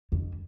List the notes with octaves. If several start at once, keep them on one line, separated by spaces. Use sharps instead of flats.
F2